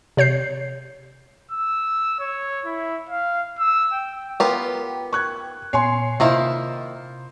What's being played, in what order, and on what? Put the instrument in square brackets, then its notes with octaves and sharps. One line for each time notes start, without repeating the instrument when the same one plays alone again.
[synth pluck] C3 C#5 G6 C7
[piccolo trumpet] E6
C#5
E4
F5
E6
G5
[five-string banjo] B3 F4 G4 [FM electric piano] A#4 B4 G5
[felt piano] C#6 F#6 G#6
[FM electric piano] A#2 B3 C7 [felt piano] C#5 G#5 C6
[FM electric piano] C3 [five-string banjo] D#3 A#3 E4 [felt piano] F4 C5